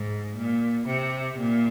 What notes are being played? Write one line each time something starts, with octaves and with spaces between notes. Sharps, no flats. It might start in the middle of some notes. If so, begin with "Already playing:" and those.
Already playing: G#2
A#2
C3
A#2